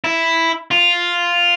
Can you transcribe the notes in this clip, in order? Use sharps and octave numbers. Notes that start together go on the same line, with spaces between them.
E4
F4